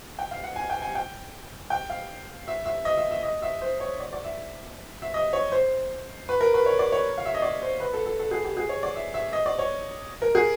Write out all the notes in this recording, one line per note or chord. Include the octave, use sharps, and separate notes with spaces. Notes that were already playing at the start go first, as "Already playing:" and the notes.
G5
F5
F#5
G#5
G5
G#5
G5
G5
F5
E5
E5
D#5
E5
E5
D#5
E5
C5
C#5
D5
D5
E5
E5
D#5
C#5
C5
B4
A#4
B4
C#5
D5
C#5
F5
E5
D#5
D5
C5
B4
A4
A4
A4
G#4
G4
G#4
C#5
D5
E5
E5
D#5
D5
C#5
A#4
G#4